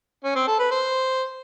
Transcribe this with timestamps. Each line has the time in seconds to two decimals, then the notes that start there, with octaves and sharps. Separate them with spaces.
0.24 C#4
0.36 C4
0.48 A4
0.59 B4
0.71 C5